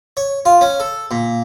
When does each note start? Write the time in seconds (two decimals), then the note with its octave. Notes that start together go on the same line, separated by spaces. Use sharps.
0.17 C#5
0.45 F4
0.61 C#4
0.80 A4
1.11 A#2